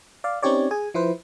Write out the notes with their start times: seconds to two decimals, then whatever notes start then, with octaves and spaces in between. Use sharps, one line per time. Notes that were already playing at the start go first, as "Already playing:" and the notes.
0.24 D5 F5
0.42 C4 C#4 D#4 G4 C#5 D5
0.71 G#4 G#5
0.94 F3 E4 B4 C5